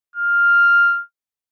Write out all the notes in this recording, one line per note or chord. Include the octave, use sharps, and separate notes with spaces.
F6